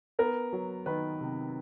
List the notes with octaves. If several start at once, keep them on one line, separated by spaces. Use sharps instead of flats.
B3 A#4
F#3
D#3 B4
C3